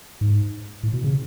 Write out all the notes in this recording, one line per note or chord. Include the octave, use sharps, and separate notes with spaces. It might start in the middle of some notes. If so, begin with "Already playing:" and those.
G#2
A2
B2
C#3